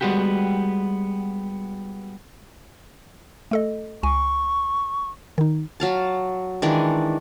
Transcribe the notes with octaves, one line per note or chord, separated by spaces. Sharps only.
G3 G#3 B3 F#4 G4
A3 A4 D#5
C#2 G#5 C#6
D#3 D#4
F#3 F5 A5
D#3 E3 G#3 D4